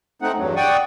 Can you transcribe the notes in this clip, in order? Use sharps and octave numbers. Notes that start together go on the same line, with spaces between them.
A3 C4 D#4 F#5
E2 G2 F#3
D5 F#5 G5 C#6 D#6